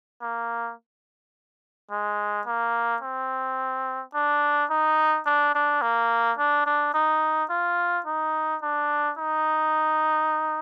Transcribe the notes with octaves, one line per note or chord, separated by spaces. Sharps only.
A#3
G#3
A#3
C4
D4
D#4
D4
D4
A#3
D4
D4
D#4
F4
D#4
D4
D#4